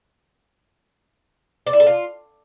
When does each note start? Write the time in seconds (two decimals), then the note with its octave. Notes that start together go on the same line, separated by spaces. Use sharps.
1.67 D5
1.73 E4
1.80 A4
1.87 F4